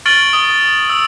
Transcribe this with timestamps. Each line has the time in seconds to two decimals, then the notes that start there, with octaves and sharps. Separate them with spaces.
0.06 C#6 F6 A6 D7 F#7 G7
0.33 D#6 G7
0.89 E6